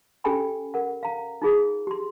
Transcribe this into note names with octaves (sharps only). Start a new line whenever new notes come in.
C#4 G4 A4 G5 G#5 B5
A#4 F#5
F5 A#5
D#4 F4 G#4
G4 C6